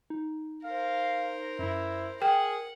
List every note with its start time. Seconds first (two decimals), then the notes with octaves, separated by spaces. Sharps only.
0.10 D#4
0.64 A#4 C5 F5
1.59 F#2 E4
2.22 G#4 A#4 F#5 G5